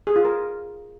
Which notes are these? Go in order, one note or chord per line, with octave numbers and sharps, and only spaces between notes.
G#4
F4
A#4